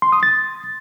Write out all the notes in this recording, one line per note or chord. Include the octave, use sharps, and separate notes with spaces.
C6
D#6
A6